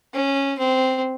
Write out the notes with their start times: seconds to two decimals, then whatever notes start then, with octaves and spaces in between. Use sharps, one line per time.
0.14 C#4
0.59 C4